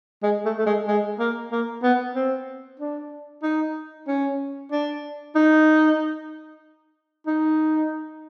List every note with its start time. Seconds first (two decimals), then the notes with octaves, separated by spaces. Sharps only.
0.23 G#3
0.45 A3
0.57 A3
0.66 G#3
0.88 G#3
1.20 A#3
1.52 A#3
1.83 B3
2.15 C4
2.80 D4
3.43 D#4
4.08 C#4
4.72 D4
5.35 D#4
7.27 D#4